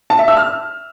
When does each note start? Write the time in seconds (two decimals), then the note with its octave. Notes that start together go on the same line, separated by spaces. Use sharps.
0.10 A5
0.19 E5
0.28 E6
0.37 F6